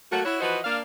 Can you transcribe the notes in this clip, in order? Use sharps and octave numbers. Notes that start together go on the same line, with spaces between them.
F#3 A3 A#3 F#4
E4 F#4 C#5
E3 F3 F#4 B4 C5 D#5
A#3 D4 F5